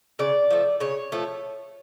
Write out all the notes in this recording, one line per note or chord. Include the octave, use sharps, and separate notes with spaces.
C#3 D5
F3 A3
C#3 C#5
F3 A3